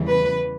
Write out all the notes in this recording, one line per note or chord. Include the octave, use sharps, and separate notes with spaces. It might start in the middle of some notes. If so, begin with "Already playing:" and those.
Already playing: E2 C#3 E3 G3
B4